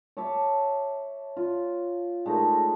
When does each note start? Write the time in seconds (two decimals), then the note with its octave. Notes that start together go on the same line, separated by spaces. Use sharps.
0.17 C#5 E5 A5 D6
1.37 F4
2.26 G#3 A3 D#4 A#4